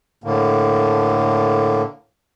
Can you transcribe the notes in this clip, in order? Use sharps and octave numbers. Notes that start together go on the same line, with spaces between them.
A2 D3 A#3